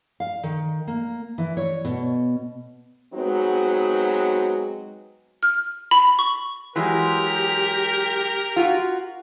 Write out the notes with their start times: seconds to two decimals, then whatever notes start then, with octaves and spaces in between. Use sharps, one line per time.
0.20 F5
0.43 D#3
0.88 A#3
1.38 E3
1.57 C#5
1.85 B2
3.13 F#3 G#3 B3 C4 D#4 F#4
5.43 F6
5.91 B5
6.19 C#6
6.76 E3 F#3 G#3 G4 A#4
8.56 F4 F#4